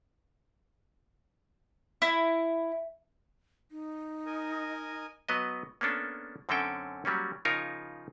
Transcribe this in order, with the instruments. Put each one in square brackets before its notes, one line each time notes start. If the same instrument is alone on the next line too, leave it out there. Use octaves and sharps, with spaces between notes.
[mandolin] E4
[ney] D#4
[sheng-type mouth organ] A#4 D#5 G#5
[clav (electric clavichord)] F#3 B3 B4 D#5
A#3 B3 C#4 D4 A4
F#2 D3 C4 C#4 A4 G5
F#3 G3 A#3 C#4
C#3 F3 D#4 F4 A#4 C#5